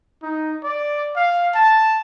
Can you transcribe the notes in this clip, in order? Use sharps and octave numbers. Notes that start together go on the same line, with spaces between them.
D#4
D5
F5
A5